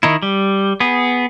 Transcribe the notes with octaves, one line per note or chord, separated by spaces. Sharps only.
D#3 D#4 E4
G3
B3 G#4